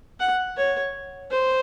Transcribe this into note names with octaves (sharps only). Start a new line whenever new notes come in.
F#5
C#5
C5